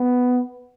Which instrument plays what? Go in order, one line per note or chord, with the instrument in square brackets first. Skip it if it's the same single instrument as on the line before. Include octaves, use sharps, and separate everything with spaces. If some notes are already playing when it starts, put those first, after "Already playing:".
Already playing: [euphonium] B3